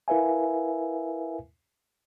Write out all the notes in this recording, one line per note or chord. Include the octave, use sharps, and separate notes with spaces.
E4 A#4 B4 E5 F5 G#5